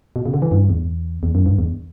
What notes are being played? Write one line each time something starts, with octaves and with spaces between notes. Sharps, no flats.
B2
C#3
D3
E3
G2
E2
E2
F#2
G2
E2